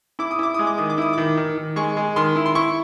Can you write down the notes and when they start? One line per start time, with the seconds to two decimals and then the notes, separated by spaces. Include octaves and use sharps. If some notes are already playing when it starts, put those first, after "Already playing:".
0.19 E4 D6
0.31 D#6
0.39 E4 D6
0.54 G#3 D#6
0.67 D6
0.78 D#3 D#6
0.90 D6
0.98 E4 D#6
1.13 D#3 D6
1.37 D#3
1.57 D#3
1.76 G#3 C#6
1.97 G#3
2.16 D#3 C6
2.36 E4
2.46 C6
2.55 E4 C#6